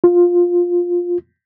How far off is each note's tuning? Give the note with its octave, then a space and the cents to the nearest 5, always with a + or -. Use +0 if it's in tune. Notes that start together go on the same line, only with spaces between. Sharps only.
F4 +10